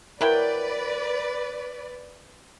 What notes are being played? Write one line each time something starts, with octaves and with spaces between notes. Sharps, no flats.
F#3 E4 A#4 B4 D5 G5